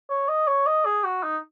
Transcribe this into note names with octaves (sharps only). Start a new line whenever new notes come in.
C#5
D#5
C#5
D#5
G#4
F#4
D#4